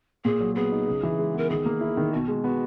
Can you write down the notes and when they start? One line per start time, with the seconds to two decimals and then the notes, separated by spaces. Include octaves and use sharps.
0.25 A#2 G#4
0.40 F#3
0.56 B3 G#4
0.72 D#4
0.87 C#3
1.03 E3
1.19 G#3
1.34 B3 A#4
1.50 D#3 G#4
1.66 A#3
1.81 E4
1.97 D#3
2.13 B2 F#4
2.28 G#3
2.43 B3 F#4